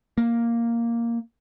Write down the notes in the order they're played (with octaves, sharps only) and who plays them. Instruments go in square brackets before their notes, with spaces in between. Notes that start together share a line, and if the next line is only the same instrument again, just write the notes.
[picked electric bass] A#3